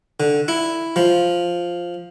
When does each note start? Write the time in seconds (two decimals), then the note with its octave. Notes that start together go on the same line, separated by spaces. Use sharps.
0.20 D3
0.48 E4
0.96 F3